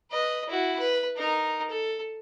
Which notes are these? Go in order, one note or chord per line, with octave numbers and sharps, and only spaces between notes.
B4 D#5
E4 F#4
B4
D#4 A#4
A4